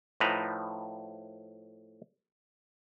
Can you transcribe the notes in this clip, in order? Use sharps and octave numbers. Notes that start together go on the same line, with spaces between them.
A2 F3 D#4 B4 A#5